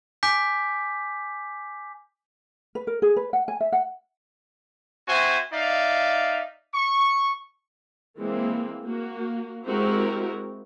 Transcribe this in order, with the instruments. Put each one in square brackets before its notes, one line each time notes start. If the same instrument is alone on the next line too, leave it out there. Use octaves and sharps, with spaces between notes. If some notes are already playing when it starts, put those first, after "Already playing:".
[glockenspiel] G#5 D6 G6 B6
[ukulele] B4
A#4
G#4
B4
F#5
G#5
E5
F#5
[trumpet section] C4 F#4 C5 E5 G#5
D#4 D5 E5 F5
C#6
[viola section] E3 G#3 A#3 C4
A#3 F#4
G#3 C4 E4 F#4 G4 A#4